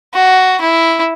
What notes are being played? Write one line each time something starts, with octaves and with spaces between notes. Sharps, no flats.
F#4
E4